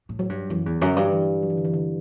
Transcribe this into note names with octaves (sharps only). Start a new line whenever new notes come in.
A2
F#3
G2
F#2 E3
E2
F#2 D3
G2
E3
F#3
E3
D3
E3
D3